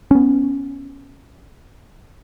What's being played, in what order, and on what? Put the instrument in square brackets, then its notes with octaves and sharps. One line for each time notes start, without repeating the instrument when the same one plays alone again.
[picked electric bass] B3 C#4